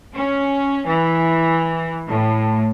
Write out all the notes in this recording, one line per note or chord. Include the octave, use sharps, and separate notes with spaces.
C#4
E3
A2